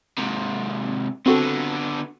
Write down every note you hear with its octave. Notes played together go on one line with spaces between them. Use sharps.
G#2 C3
D3 B3 C4 F#4 A4